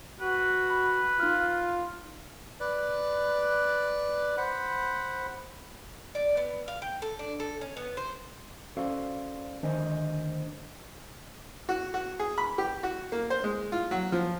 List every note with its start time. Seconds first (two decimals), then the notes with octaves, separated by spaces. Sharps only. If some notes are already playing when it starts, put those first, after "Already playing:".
0.20 F#4 B4
0.70 B5
1.20 D#4 F4 F6
2.60 B4 D5
4.38 C5 F#5 B5
6.15 D5
6.37 B3
6.68 F5
6.82 G5
7.02 A4
7.19 D4
7.40 A4
7.61 C#4
7.77 B3
7.97 C5
8.77 C#4 F#4 A4 C5 D5 F5
9.62 D2 D#3 D4 C5 D#5 G#5
11.69 F#4
11.94 F#4
12.20 G#4
12.38 B5
12.58 G4
12.83 F#4
13.12 A#3
13.30 C5
13.44 G#3
13.72 F4
13.91 F#3
14.12 F3